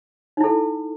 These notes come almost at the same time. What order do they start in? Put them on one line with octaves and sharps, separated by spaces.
D#4 E4 A4